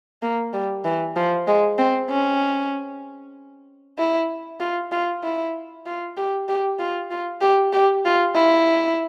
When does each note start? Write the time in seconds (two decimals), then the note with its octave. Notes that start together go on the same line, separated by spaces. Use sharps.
0.22 A#3
0.53 G3
0.85 E3
1.16 F3
1.48 G#3
1.79 C4
2.10 C#4
3.98 E4
4.60 F4
4.92 F4
5.23 E4
5.86 F4
6.17 G4
6.48 G4
6.79 F4
7.11 F4
7.42 G4
7.73 G4
8.05 F4
8.36 E4